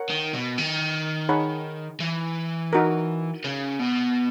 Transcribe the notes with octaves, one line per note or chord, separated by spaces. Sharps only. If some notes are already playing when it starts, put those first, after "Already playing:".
Already playing: A#4 C#5 F#5
D#3
B2
D#3
D#4 G#4 C#5 F#5 B5
E3
D#4 F#4 A#4
C#3
B2